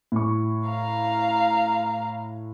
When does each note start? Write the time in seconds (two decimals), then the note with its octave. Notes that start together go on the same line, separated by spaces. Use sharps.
0.12 A2 C#6
0.69 F5 A#5